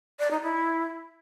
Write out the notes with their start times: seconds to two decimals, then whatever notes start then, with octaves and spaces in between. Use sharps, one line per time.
0.19 D5
0.31 D#4
0.42 E4